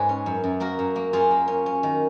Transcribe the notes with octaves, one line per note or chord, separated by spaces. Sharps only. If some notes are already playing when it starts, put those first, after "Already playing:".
Already playing: G#2 G#3 G#4 B4 C#5
C#4
F#2
F#2
A#3 F#4 A#4
F#2
A#3
F#2 F4 G#4
A#3
C#4
C#4
D#3